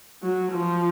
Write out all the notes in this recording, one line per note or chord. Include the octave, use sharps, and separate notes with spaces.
F#3
F3